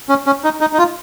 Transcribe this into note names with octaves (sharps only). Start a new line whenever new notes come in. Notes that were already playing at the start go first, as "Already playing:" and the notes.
C#4
C#4
D#4
D#4
D#4
F4